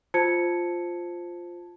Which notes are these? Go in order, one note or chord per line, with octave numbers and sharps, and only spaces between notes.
F4 C5 A5 E6 G#6 C#7